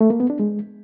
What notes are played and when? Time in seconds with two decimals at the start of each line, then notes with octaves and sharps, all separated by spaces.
0.01 A3
0.10 A#3
0.20 B3
0.30 D4
0.40 G#3